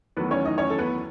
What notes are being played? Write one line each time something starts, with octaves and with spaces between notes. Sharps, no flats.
E2 D#3 F#3 A3 B3 B4
C#4 C#5
D#4 D#5
C#4 C#5
A4
B3 B4